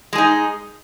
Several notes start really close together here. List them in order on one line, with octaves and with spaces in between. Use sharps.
G#3 G#4 D#4